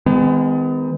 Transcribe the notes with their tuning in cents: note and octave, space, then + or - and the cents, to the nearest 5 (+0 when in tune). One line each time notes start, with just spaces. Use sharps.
D#3 +25 G#3 -15 B3 +40